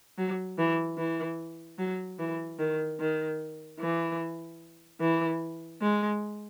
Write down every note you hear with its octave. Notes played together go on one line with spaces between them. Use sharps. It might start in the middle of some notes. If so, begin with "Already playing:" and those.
F#3
E3
E3
F#3
E3
D#3
D#3
E3
E3
G#3